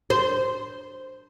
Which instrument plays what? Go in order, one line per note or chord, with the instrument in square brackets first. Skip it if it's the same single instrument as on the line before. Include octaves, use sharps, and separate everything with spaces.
[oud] C5